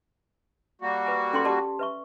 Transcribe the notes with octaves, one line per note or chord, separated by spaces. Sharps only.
G3 A#3 F#4
B4 G#5
C#4 A4 G5 C6
G4 A4 D5 A5 C6 D6
B4 E5 C#6